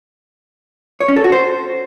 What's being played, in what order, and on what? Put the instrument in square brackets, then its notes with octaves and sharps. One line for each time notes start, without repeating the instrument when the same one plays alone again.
[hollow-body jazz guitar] C#5
C#4
A4
F#4
C5